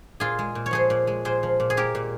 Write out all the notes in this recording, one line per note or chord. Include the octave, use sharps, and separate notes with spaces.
A#2 F4 G#4
G#3
A#2
C#5
F3 G#4 C5
A#2
G#3
A#2 G#4 C5
F3
A#2
G#4
G#3 G4 A#4
A#2